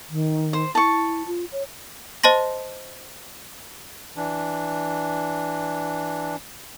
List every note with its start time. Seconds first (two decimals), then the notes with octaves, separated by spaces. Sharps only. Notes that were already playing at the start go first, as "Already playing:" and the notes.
0.10 D#3
0.53 C5
0.75 E4 A5 C#6
1.27 F4
1.52 C#5
2.24 C5 D#5 A5 C6 A#6
4.16 E3 D4